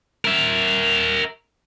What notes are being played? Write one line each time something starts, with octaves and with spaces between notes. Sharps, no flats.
A#4 E5